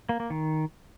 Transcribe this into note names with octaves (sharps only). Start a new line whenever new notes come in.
A#3
A#3
D#3